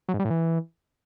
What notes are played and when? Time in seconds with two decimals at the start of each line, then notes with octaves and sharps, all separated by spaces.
0.08 F#3
0.14 G#2
0.19 G3
0.25 A2
0.30 E3